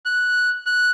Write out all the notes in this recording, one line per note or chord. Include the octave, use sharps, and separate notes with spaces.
F#6
F#6